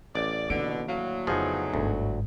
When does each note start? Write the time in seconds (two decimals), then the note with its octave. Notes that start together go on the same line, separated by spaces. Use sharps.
0.15 A1 D5
0.50 B2 D3 D#3 A#3 D7
0.88 A2 D3 F#3 F5
1.27 F2 C#3 F3 B3 D#4 G#4
1.74 G1 D2 G#2